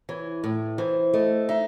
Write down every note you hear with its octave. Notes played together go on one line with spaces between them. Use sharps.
E3 C#5
A2
E3 C5
A3 D#5
D#4 E5